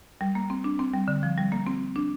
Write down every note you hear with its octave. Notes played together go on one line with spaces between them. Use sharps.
G3
A#3
C4
D4
C4
G3
D3
F3
G3
A#3
C4
D4